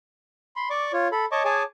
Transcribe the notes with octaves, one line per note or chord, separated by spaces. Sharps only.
B5 C6
D5 C#6 D6
F4 C#5
A4 B5
C#5 D#5 A5 C#6 D6
G#4 C#5 G#5 A5 D6